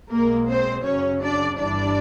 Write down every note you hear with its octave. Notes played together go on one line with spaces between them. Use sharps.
B1 B2 G#3 A#3 A#4
C4 C5
F#2 C#3 F#3 C#4 C#5
D4 D5
G1 G2 E3 G3 D4 D5